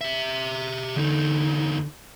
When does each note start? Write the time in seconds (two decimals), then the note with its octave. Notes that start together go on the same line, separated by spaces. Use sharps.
0.01 G4 E5
0.96 E2 D3 D#4